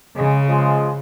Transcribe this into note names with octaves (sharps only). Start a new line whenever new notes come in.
C#3 G#3
F3 G#3